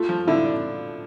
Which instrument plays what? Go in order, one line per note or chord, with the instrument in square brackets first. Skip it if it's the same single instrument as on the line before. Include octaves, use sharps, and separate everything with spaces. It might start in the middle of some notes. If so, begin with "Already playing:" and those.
Already playing: [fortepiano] A3 [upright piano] F4
[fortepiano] F3
[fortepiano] D3 [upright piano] E4
[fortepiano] D4